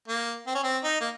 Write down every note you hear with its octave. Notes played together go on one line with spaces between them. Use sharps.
A#3
C4
C#4
C4
D#4
A#3